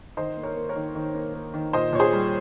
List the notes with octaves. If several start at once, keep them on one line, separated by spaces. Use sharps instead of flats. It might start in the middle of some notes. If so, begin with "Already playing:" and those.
D#3 C5 D#5
A#3
A#4 C#5
A#3
A#4 C#5
D#3
D#3
A#3
A#3
D#3
A#2 C5 D#5
A#2 C#5
G#4 C5
G3